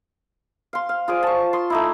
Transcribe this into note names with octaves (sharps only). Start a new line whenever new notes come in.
F5 C6
F5
F4 G#4 C5 D5
A5 C#6
C6 D#6
A3 D#4 E4